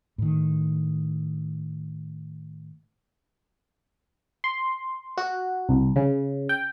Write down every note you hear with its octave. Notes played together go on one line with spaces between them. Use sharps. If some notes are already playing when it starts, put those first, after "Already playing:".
A2 D#3
C6
F#4
C2
C#3
G5